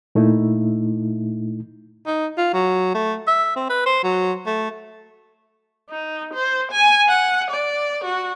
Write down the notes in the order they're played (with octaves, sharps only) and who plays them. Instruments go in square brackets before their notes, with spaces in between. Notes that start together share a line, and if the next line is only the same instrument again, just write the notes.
[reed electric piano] A#2 A3 D#4 E4
[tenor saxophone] D#4
F4
F#3
A3
E5
C4
B4
C5
F#3
A3
[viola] D#4
C5
G#5
F#5
D5
F#4